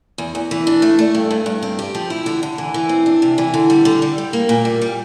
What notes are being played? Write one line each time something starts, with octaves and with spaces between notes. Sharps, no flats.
E2
E2
E3
D4
A3
A3
G2
G2
G2
C4
G4
F3
E4
D3
D3
E3
E3
C4
D4
C3
E3
D3
G3
D3
G3
G3
A#3
A#2
G3
G3